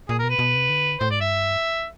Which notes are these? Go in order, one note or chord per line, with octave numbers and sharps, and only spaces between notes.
A#2 G#4
B2 A#4
B4
B2
C3
D3
A2 C5
G#2 D5
G2 E5